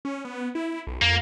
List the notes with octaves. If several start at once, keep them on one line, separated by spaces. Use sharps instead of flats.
C#4
B3
E4
B1
F2 A#3